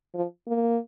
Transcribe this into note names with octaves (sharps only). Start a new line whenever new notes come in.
F3
A#3